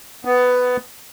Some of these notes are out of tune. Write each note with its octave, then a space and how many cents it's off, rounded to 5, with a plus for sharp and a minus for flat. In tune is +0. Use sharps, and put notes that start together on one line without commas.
B3 +10